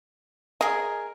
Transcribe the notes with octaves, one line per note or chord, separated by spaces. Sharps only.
G#4 A#4 D#5